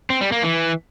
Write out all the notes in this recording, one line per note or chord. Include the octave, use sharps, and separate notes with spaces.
C4
G3
A#3
E3